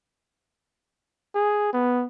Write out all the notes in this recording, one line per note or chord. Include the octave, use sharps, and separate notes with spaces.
G#4
B3